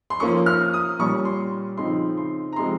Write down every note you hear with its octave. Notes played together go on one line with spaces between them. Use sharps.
C6
F3 A#3 C#4 C#6
F6
D#6
A#2 G3 C#4 C#6
C6
C#3 F3 C4 D#4 C6
C6
A#5
C3 F3 G#3 C4 C6